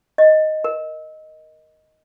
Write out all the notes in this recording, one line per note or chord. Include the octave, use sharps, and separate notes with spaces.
D#5
A#4